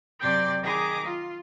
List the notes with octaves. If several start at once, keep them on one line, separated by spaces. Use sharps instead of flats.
F#2 C3 D5 G5 C6 A6
D#3 G#4 D#5 A#5 D6
F4